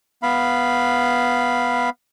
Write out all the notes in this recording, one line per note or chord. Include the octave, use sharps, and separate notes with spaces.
B3 F5 B5